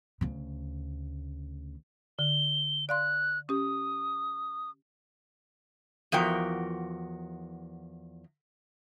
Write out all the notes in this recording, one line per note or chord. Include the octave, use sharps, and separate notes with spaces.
D2 C#3
D3 G7
D5 F5 C6 F#6
C#4 G4 D#6
E2 F3 F#4 A#4 G5